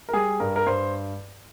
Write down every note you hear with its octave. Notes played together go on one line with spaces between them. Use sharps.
A#4
G3 G#4
G2 A#4
A#4
G2 C5